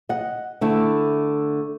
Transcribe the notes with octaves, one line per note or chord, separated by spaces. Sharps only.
D#5 F#5
D3 A3 E4